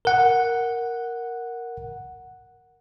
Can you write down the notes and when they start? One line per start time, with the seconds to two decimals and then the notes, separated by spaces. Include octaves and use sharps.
0.05 A#4 F#5